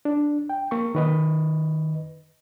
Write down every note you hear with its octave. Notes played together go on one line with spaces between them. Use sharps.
D4
G5
A#3 C#6
D#3 B4 D#5